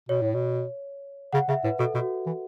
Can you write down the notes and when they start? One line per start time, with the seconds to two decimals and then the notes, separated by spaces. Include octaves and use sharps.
0.09 B2 C#5
0.22 A2
0.34 B2
1.33 C#3 F#5
1.48 C#3 E5
1.64 A2 B4
1.79 B2 A4
1.95 B2 F#4
2.26 E3